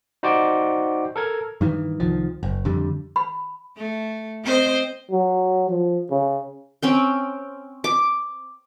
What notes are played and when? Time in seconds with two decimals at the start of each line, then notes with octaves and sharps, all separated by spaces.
0.23 D#4 F#4 C5 D5 G5 D6
1.16 A4 A#4 G#6
1.61 G2 D#3 E3
2.00 C2 D#3 F3
2.43 F#1
2.65 F2 D3 G3
3.16 B5
3.76 A3
4.43 C4 C5 D#5
5.11 F#3
5.69 F3
6.10 C#3
6.82 C4 C#4 G5
7.84 D6